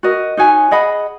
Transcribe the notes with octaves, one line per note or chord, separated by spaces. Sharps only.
F#4 A#4 D#5
D#4 F#4 C#5 G#5
G#4 D#5 F#5 B5